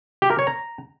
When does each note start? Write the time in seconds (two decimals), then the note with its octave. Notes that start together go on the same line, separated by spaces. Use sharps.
0.22 G4
0.30 A#4
0.39 C#5
0.47 A#5